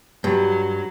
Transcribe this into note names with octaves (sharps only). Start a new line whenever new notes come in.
G2 F#3